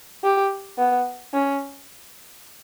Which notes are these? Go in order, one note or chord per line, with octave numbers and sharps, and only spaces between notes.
G4
B3
C#4